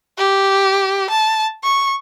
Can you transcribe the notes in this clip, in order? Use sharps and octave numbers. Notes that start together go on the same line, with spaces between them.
G4
A5
C#6